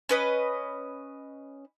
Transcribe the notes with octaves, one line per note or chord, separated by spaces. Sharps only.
C#4 B4 D#5